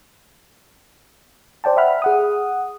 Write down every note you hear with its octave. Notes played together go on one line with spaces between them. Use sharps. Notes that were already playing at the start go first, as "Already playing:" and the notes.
C5 D5 G5 A5
E5 F#5 B5 F6
G#4 F#5 D#6